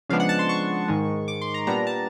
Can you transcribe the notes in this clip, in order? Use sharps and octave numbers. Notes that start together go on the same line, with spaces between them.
C#3 F3 G#3 B3 D4 F5
F#5
A5
C6
C#6
G#2 D#3 G#3
D6
C6
A#5
A#2 G3 B3 D4 A#5
A5